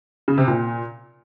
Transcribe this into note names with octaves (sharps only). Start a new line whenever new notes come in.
C#3
C3
A#2